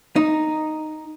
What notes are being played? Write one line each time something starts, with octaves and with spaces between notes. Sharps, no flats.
D#4